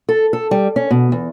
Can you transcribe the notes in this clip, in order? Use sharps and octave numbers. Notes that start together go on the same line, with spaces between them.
A4
A4
G3
C#4
B2
E2